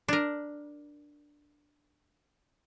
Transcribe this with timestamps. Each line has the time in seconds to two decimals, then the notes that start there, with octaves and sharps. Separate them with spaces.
0.08 D4 A#4